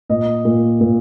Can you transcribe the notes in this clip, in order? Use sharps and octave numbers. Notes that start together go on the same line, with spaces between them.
A#2 D#5
A#2
A#2